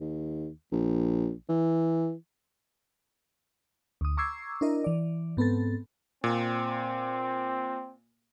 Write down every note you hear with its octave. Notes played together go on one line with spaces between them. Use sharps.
D#2
A#1
E3
D2 D#6
A#5 C#6 D6 E6 G#6 C7
D4 E4 A#4 D#5
E3 D5
G#2 B3 C4 A4 A6
A#2 C4